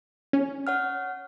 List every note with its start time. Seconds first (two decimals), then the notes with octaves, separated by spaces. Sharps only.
0.33 C#4
0.67 C#5 F#5 F6